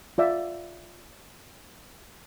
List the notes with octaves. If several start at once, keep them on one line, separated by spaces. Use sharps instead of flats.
F4 D5 E5